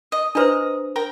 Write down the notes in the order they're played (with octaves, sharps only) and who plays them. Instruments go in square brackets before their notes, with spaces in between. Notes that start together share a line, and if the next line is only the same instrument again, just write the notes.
[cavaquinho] D#5
[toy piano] D4 B4 C5 [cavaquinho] D#5 A#5
[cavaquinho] A#4 G5 A#5